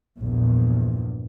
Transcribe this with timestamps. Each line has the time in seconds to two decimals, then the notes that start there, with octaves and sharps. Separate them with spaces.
0.20 A#1 E2 G2 A#2